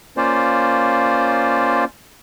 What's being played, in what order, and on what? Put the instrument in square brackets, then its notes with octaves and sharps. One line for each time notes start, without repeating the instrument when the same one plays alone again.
[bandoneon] A#3 C#4 F4 C5 D5